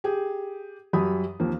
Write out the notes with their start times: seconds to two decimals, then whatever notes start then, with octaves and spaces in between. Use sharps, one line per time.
0.04 G4 G#4
0.93 F#2 F#3 G3 G4 B5 D#6
1.40 D#2 F3 A#3 C4